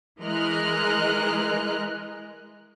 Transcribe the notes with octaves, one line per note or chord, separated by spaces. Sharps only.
E3 G#3 A#4 D#5 F6 F#6